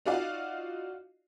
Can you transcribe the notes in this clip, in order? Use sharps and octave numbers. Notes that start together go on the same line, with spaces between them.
D#4 F4 F#4 D5 D#5 F5